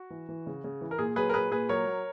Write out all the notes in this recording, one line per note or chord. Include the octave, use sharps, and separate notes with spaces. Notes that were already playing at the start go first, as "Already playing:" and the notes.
Already playing: F#4
E3
E3
C#3
C#3
E3
A#4
A#2 G#4
F#3 G#4 B4
A#4
A#2 G#4 B4
A#2 G#4 B4
F#3 A#4 C#5
F#3